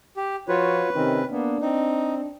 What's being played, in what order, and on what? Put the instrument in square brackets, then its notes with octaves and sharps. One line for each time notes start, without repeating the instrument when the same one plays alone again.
[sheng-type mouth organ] G4
[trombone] F3 [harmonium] F4 F#4 C#5 [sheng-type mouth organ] B4
[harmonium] C3 C4 C#4 [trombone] D#3
[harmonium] A#3 B3 [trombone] D4
[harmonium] C4 [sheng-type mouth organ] D#4